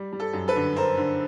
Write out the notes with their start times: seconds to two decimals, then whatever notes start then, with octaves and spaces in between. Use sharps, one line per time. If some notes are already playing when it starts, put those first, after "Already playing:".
Already playing: G3
0.13 G3
0.20 A4
0.33 F#2
0.48 A4 B4
0.56 D3
0.76 D3 A#4 C5
0.98 D3